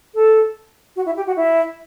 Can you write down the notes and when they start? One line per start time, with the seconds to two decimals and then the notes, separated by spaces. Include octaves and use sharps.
0.15 A4
0.96 F#4
1.06 E4
1.17 G4
1.27 F#4
1.36 E4